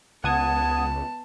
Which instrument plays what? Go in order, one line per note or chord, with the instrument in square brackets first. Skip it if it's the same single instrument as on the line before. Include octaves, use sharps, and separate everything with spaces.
[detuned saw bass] C#2 [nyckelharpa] B3 A5 [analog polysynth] F#5 D#6 G#6